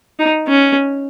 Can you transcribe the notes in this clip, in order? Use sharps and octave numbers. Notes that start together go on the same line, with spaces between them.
D#4
C#4